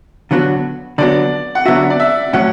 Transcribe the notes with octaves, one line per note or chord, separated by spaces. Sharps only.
D3 F#3 B3 F#4
D3 F#3 B3 F#4 D5
F#5
D3 F#3 B3 F#4 E5
D5
E5
A2 F#3 C#4 F#5